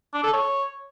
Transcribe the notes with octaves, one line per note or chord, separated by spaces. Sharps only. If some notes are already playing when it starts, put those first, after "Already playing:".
D4
A4
C#5